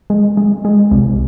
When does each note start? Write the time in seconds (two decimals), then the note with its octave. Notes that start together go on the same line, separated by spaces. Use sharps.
0.10 G#3
0.37 G#3
0.65 G#3
0.91 C2